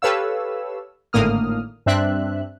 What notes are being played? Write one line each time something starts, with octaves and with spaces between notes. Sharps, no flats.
G4 A4 B4 C#5 F5 E6
G#1 A2 D3 A#3 D#6 F6
G2 C4 D4 E5 F#6